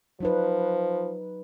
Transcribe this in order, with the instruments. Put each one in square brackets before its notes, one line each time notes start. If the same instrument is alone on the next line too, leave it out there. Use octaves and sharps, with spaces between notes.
[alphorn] F3 [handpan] F#3 D#4 B4